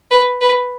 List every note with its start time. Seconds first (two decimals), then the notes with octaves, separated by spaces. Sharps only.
0.11 B4
0.41 B4